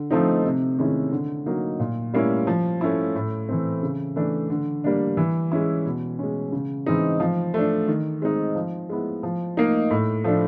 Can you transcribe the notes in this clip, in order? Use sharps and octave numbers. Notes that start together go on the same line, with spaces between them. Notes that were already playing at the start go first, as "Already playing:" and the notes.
Already playing: D3
F3 A3 C4 D#4
C3
D#3 G#3 C#4 E4
D3
F#3 A#3 D#4
A#2
G3 A#3 C#4 E4
F3
A3 C#4 E4
A2
E3 A3 C4
C#3
E3 A3 D4
D3
G3 A#3 D4
E3
G#3 C#4 E4
B2
G#3 C#4
C#3
E3 G#3 C4 D#4
F3
A3 D4
D#3
G#3 C4 D#4
F3
G#3 B3 E4
F3
A#3 D#4
A2
F3 A3 D4